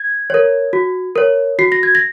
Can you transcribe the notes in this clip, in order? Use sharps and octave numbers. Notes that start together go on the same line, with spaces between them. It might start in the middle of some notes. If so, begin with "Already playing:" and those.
Already playing: G#6
A#4 C#5
F#4
A#4 C#5
F#4 C7
A#6
G#6
A#6